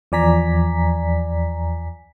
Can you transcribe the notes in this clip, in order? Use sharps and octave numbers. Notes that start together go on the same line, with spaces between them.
E2 F3 D5 G#5 A#5 B6